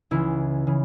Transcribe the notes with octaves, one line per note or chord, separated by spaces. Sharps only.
C#2 C#3 E3 E4
C#3 E3